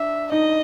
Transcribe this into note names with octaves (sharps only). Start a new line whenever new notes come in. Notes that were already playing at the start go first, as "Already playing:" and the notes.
Already playing: D4 E5
D#4 D#5